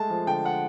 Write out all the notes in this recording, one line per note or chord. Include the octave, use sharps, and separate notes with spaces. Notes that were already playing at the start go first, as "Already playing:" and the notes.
Already playing: G#3 A3 A5
F3
D3 G5
F#5